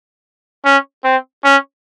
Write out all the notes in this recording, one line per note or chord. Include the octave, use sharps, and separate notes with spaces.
C#4
C4
C#4